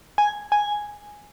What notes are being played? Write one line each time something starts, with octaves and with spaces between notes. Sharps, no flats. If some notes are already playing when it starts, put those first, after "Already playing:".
G#5
G#5